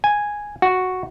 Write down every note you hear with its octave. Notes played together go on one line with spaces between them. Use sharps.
G#5
F#4